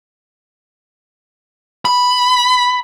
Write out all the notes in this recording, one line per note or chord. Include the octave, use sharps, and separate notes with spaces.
B5